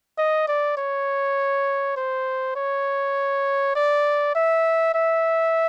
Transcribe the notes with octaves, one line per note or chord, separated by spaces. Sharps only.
D#5
D5
C#5
C5
C#5
D5
E5
E5